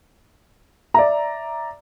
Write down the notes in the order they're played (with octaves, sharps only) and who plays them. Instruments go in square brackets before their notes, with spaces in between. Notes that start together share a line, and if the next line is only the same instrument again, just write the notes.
[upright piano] D5 E5 A#5